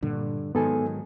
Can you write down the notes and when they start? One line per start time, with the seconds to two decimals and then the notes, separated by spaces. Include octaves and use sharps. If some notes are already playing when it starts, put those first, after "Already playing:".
0.03 G2 A#2 D3
0.55 G#2 D#3 F#3 B3 A4 G#5